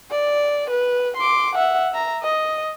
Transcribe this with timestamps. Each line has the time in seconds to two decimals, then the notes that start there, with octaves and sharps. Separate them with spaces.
0.11 D5
0.70 B4
1.17 C6 D6
1.55 E5 F#5
1.92 E5 A#5
2.22 D#5